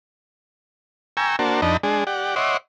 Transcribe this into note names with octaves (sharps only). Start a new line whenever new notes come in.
G5 G#5 A#5 C#6 E6
A#3 D4 F#4 C5 A5
F2 D4 D#4 D#5 A5 B5
G#3 D4 G#4
G4 D5 F#5
C#5 D#5 E5 F#5 C6 D6